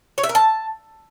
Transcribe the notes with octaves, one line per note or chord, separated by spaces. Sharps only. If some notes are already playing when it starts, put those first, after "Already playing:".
C#5
E5
A#4
A5